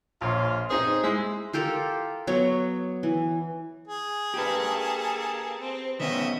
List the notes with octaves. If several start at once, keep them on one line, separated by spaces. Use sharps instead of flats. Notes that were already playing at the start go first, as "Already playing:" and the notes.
A#1 F4 C#5 C6
C4 D#4 G#4
G#3 E4
F4 G4 A4 A#4
F#3 B3 C#5
E3
G#4
A#3 G4 A4 B4
C4
D#3 B3 C#4 D#5 E5